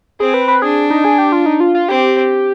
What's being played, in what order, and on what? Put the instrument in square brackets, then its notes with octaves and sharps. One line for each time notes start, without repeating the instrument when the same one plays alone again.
[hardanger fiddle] C4 [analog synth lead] G#4
[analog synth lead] B4
B4
[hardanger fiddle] D4 [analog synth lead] G#4
[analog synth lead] D#4
G#4
G4
F4
D#4
F4
F4
[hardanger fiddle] C4 [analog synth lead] G4